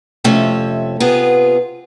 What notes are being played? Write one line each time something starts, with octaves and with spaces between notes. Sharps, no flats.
F2 C3 A3 C#4 E5
C3 B3 F4 G#4